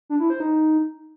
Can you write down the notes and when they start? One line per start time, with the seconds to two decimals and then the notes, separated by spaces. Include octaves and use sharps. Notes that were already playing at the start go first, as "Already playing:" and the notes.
0.09 D4
0.20 E4
0.30 C5
0.40 D#4